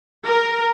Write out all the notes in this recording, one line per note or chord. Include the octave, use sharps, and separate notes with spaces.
A#4